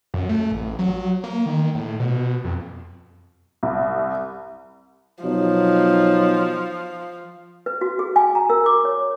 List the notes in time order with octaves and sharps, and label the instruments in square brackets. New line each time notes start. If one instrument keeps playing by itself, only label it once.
[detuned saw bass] F#2
A3
A1
F#3
A#3
D#3
A2
B2
F2
[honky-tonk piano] C2
[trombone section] B2 F#3 D#4 [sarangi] F3
[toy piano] B4
F#4
G#4
G#5
A#5
A#4
D6
C#5